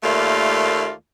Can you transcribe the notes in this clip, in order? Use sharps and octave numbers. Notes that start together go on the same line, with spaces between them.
D#2 A3 A#3 F4 D5 E5